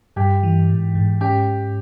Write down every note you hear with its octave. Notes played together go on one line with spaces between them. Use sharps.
G2 G4
E3
G#2
G#2
C#4 G4